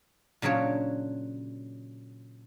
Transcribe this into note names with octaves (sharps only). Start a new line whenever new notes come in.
A#2 C#3 F#3 D4 C#5